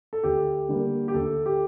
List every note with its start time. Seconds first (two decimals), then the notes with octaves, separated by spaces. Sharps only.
0.13 A4
0.23 D2 G4
0.69 D3 G3 A#3
1.08 G4
1.14 D2 A4
1.46 G4